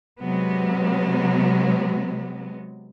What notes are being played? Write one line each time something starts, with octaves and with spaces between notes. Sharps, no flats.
C3 F#3 G#3 B3